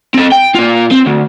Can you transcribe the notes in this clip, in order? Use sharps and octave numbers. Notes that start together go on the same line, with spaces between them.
C4 A4
G5
A#2 F4
C4
D2